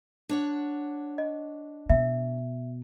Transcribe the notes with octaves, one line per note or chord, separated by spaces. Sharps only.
D4 C#5 F#5
D#5
B2 E5